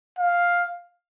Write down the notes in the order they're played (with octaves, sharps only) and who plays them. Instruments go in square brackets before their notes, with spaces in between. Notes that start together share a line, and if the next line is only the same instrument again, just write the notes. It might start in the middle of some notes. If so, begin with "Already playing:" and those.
[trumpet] F5